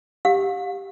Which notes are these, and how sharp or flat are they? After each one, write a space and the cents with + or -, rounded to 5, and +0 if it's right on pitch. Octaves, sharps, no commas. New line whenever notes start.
G4 +0 F5 +40